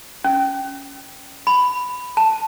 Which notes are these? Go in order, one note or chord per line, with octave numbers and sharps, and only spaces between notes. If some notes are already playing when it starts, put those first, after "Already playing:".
C#4
B5
A5